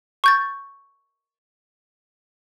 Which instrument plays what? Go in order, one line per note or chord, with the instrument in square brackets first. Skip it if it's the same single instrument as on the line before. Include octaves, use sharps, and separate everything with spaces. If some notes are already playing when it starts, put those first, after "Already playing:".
[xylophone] C#6 G6 A6